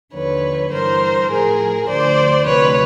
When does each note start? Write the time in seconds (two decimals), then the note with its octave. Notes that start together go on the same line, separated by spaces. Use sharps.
0.14 D#2 D3 F3 B4 C#5
0.71 G2 E3 A#4 C5
1.30 A2 F3 G#4 A#4
1.88 D2 D3 F3 C5 D5
2.45 D2 C3 F3 B4 C#5